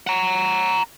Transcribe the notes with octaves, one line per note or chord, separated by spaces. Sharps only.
F#5 A#5